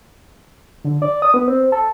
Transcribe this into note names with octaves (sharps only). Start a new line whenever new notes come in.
D3
D5
D#6
B3
C4
A4